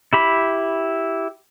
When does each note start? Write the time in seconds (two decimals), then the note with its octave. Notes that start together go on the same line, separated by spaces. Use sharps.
0.13 E4 G4 B5